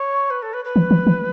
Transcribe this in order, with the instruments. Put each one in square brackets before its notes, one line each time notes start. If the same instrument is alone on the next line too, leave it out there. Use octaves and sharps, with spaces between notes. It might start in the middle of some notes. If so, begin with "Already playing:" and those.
Already playing: [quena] C#5
B4
A4
B4
B4
[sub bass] E3
E3
E3